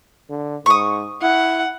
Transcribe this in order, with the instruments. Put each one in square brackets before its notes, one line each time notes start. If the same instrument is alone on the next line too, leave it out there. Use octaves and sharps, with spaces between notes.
[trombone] D3
[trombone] G#2 [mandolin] C#6 D#6
[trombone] E4 [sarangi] F#5